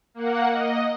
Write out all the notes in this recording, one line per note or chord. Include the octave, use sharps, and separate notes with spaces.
A#3 F#5
D#5